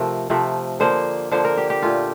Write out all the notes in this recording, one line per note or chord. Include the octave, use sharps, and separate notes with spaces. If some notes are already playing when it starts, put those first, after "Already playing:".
Already playing: C3 F3 A3 A#4
C3 F3 A3
D3 F3 A#3 C5
D3 F3 A#3 C5
A#4
G4
G4
A#2 A3 F4